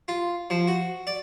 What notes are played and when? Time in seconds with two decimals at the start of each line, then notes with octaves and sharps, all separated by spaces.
0.08 F4
0.50 F3
0.68 F#4
1.07 D5